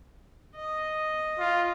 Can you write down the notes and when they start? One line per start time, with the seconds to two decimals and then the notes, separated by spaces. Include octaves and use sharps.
0.56 D#5
1.39 F4